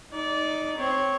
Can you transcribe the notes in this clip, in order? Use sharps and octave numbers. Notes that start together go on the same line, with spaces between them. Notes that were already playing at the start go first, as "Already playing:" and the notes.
D#4 D5
C4 C#5